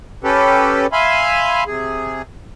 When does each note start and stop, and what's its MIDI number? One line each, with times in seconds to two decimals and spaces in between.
0.24 0.87 61
0.24 0.87 67
0.24 0.87 69
0.24 0.87 71
0.92 1.64 76
0.92 1.64 77
0.92 1.64 80
0.92 1.64 83
0.92 1.64 84
1.67 2.22 48
1.67 2.22 68